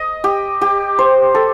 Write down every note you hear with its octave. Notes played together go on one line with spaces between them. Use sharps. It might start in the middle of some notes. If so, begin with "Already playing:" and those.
Already playing: D#5
G4
G4
C5
A4